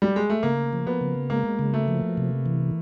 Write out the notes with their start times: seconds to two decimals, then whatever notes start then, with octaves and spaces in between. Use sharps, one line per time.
0.02 G3
0.16 G#3
0.30 A3
0.43 C#3 A#3
0.73 F3
0.87 B3
1.01 C#3
1.30 G#3 A#3
1.59 C#3
1.74 A3
1.88 F3
2.17 C3
2.46 E3